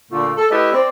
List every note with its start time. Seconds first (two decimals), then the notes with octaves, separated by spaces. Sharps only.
0.11 A#2 D3 A3 F4
0.36 A4
0.51 A3 E4 G4 B4 D#5
0.72 C4 D5